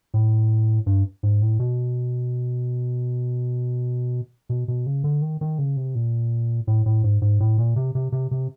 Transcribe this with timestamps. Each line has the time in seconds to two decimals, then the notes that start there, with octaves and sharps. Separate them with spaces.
0.14 A2
0.86 G2
1.23 G#2
1.41 A2
1.59 B2
4.49 B2
4.68 B2
4.86 C#3
5.04 D3
5.22 D#3
5.41 D#3
5.58 C#3
5.77 C3
5.95 A#2
6.67 A2
6.86 A2
7.04 G#2
7.22 G#2
7.40 A2
7.58 A#2
7.76 C3
7.95 C3
8.12 C3
8.31 C3